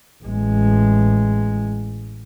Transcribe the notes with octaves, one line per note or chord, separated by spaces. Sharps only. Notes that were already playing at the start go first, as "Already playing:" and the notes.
A1 G#3